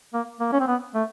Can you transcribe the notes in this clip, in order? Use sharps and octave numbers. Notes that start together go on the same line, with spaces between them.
A#3
A#3
C#4
C4
B3
A3